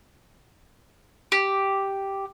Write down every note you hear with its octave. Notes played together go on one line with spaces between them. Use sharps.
G4